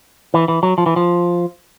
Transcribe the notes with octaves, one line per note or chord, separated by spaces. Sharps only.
E3
E3
F#3
F3
E3
F3